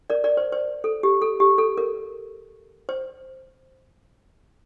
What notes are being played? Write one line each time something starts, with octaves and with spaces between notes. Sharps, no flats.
A#4 D5
A#4 D5
C5
C5
A4
G4
A4
G4
A4
A#4
C5